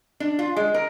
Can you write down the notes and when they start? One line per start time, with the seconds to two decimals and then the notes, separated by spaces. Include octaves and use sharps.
0.20 D4
0.39 F4
0.57 G#3
0.74 A#4